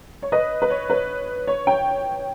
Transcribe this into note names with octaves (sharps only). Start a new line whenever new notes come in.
C#5
B4 D#5
B4
C#5
B4
C#5
G5